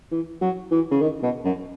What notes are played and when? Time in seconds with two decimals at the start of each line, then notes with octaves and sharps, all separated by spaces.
0.12 E3
0.41 F#3
0.71 E3
0.91 C#3
1.01 D#3
1.23 B2
1.45 F#2